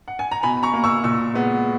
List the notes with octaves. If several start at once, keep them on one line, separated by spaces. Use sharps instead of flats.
F#5
G#5
A#5
B2 G#5 B5
A#5 C#6
A#3
C#6 E6
A#2 C#6 E6
G#3 B3